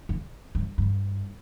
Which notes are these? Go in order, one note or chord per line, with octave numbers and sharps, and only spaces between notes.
F2
G2
G2